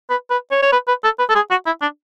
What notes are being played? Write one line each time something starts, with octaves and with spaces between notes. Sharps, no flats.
B4
B4
C#5
C#5
B4
B4
A4
B4
A4
G#4
F#4
E4
D4